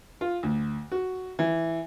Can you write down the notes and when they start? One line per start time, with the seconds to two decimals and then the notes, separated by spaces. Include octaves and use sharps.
0.21 F4
0.43 D2
0.92 F#4
1.39 E3